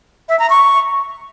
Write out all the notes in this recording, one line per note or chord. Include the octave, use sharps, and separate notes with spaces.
E5
A#5
C#6